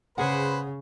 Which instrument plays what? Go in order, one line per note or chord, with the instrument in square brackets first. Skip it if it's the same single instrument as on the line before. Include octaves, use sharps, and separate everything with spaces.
[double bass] C#3 [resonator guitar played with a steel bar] G#4 F#5 [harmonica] B4 C5